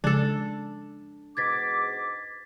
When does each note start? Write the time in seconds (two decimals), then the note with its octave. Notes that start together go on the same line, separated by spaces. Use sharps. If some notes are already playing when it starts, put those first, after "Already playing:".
0.04 C#3 F3 G#3 D4 A4
1.37 G#2 B2 D6 G#6 A6 B6